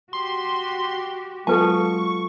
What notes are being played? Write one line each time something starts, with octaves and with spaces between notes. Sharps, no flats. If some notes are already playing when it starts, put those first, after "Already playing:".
F#4 G4 C6
F#3 G#3 B3 F4 A4 B4 A5 C#6